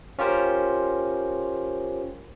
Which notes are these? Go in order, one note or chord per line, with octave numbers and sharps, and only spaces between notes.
C#4 F4 G4 A#4 C5